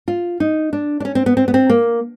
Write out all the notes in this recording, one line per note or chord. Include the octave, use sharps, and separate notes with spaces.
F4
D#4
D4
D4
C#4
C4
B3
C4
B3
C4
A#3